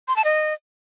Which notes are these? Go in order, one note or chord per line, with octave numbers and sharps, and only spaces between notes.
C6
A5
D#5